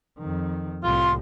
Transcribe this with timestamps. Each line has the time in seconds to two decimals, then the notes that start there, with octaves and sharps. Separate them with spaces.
0.19 F2 D#3
0.83 C2 A2 F4 C6